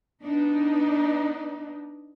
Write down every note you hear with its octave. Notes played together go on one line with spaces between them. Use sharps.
B3 D4 D#4